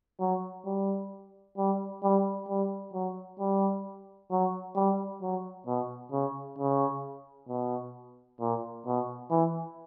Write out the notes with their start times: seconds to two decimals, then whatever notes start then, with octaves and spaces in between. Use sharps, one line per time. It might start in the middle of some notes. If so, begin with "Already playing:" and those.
0.20 F#3
0.66 G3
1.58 G3
2.03 G3
2.49 G3
2.93 F#3
3.40 G3
4.31 F#3
4.76 G3
5.22 F#3
5.67 B2
6.12 C#3
6.59 C#3
7.48 B2
8.41 A#2
8.86 B2
9.31 E3